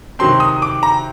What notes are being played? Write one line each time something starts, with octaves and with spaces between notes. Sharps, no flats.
C3 D#3 F#3 C4 C6
D#6
D6
A#5